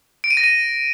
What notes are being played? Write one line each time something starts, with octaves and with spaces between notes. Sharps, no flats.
D7
D#7
A#6
D#7